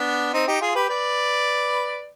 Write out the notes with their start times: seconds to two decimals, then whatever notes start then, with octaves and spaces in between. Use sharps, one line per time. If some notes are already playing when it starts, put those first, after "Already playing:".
Already playing: B3 D4
0.33 C4 D#4
0.47 D#4 G4
0.61 F4 G#4
0.75 G4 B4
0.89 B4 D5